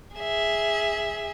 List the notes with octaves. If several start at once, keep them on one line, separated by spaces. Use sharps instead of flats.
G#4 E5